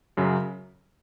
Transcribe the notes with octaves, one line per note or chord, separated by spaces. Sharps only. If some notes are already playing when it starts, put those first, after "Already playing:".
F#2 C#3 F#3